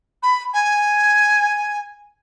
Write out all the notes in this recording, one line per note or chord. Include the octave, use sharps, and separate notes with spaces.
B5
G#5